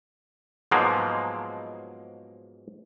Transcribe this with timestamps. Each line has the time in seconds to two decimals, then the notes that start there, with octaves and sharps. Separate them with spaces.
0.71 G#2 B2 F3 F#3 G#3 A#3